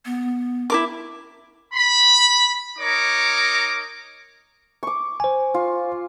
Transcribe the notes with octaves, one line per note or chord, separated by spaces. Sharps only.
B3
E4 A#4 D6
B5
D#4 A#4 C#5 D#5 D6
C#6 D6
C5 G#5
F4